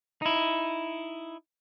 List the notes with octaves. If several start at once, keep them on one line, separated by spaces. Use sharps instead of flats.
D#4 E4